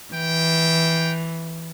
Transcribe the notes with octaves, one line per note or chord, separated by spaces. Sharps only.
E3 G5